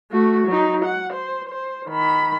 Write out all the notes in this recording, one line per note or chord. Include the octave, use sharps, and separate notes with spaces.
A3 F#4
F#3 D#4
F#5
C5
C5
D#3 B5